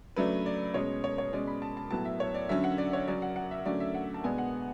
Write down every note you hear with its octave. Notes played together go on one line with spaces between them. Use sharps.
C#3 F#3 A3 D4 B4
D5
B2 G#3 C#4 C#5
C#5
C#5
B2 G#3 C#4 D5
B5
A5
A5
A2 F#3 B3 A5
E5
C#5
D5
D3 F#3 C#4 E5
F#5
D5
C#5
C#3 F#3 C#4 D5
F#5
F#5
E5
D3 F#3 A3 C#4 D5
E5
F#5
A5
B2 G#3 B3 D4 G#5
F#5